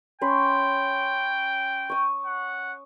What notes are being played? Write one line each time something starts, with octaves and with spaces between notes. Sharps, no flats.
C#4 G5 B5 C6
C#6 D#6
F#5